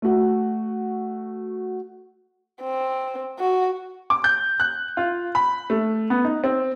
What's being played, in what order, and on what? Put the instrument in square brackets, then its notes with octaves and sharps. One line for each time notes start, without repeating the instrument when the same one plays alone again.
[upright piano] A3 F#4
[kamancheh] C4
F#4
[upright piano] D6
G6
F#6
F4
B5
A3
B3
D#4
C4